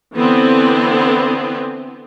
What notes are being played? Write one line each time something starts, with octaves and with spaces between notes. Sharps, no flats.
D3 E3 B3 C4